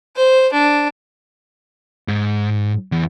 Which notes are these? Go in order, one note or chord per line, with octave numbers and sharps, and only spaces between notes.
C5
D4
G#2
E2